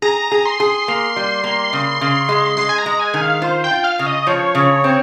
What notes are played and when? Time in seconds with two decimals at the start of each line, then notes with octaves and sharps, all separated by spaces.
0.02 G#4 A#5
0.32 G#4
0.45 C6
0.60 G#4
0.88 A#3
1.16 G3
1.44 A#3
1.73 C#3
2.01 C#3
2.29 G#3
2.57 G#3 C6
2.69 G#5
2.78 A#5
2.86 G#3
2.99 G#5
3.14 D#3
3.22 F5
3.42 F4 C5
3.64 G5
3.71 F4
3.84 F5
3.99 C#3
4.06 D#5
4.27 F3 C#5
4.55 C#3
4.84 C4